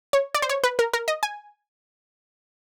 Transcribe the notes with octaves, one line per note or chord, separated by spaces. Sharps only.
C#5
D5
C5
C#5
B4
A#4
A#4
D#5
G#5